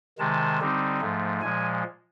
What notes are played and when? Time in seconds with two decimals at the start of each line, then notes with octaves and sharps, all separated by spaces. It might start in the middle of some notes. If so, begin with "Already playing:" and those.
0.18 C3 D#3 G#3 A5
0.60 D3 G3 C4 D#4
1.00 G#2 F3 A3
1.41 A#2 F3 G#3 G#5